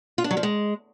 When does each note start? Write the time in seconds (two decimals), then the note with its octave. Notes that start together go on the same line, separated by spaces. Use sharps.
0.18 F4
0.24 D4
0.31 F#3
0.37 F3
0.43 G#3